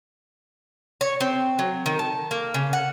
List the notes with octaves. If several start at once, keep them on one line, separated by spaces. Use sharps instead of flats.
C#5
C4
F#3
D#3
A5
A#3
C#3
F#5